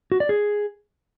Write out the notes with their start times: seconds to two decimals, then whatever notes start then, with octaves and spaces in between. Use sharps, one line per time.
0.12 F#4
0.20 D5
0.29 G#4